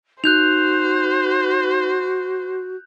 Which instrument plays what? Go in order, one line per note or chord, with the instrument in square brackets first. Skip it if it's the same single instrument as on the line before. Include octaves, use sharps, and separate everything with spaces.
[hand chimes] D#4 [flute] F#4 [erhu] C5 [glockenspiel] F#6 G6 F7